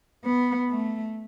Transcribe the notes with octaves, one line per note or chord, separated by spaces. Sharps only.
B3
A3